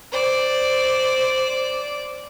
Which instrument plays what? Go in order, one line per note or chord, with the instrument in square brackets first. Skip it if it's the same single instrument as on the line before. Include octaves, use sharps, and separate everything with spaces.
[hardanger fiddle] C5 D5